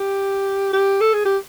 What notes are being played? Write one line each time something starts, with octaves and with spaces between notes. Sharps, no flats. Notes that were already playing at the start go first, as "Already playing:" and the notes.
Already playing: G4
G4
A4
G#4
G4